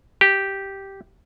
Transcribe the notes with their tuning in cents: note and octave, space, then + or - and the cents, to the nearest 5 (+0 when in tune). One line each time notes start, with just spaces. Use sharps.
G4 -5